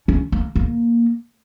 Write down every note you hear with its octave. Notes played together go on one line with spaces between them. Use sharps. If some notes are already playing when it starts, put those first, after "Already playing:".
C#4
A#3
A#3